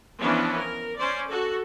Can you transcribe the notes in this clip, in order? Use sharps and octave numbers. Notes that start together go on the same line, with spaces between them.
E3 F3 B3 C#4 D4
A#4
C#4 C5 D5
F#4 A4